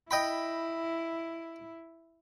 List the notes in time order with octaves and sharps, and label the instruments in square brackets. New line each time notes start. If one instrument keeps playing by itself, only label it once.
[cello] E4 [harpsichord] D#5 G5 B5